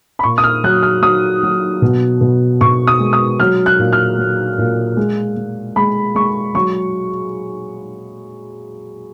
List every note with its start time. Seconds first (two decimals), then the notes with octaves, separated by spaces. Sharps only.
0.19 B5
0.23 A#2 C#6
0.38 D#6
0.44 F6
0.64 F#3 F#6
0.83 F6
1.02 F#3 D#6
1.43 F#3
1.82 B2
2.21 B2
2.61 B2 C#6
2.87 D#6
2.99 G#3
3.13 D#6
3.40 F#3 F6
3.66 F#6
3.79 A#2
3.93 F6
4.19 F#3
4.58 A#2
4.97 G#3
5.36 G#3
5.76 G#3 B5
6.15 G#3 C#6
6.55 F#3 C#6